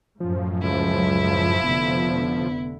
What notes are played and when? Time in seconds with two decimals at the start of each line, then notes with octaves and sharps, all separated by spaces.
0.20 F#2 A2 F3
0.63 C#2 E4
1.64 F1 D3 B3